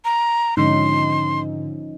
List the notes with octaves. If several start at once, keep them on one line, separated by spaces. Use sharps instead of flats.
A#5
G#2 D3 F3 C#4 D#4 C6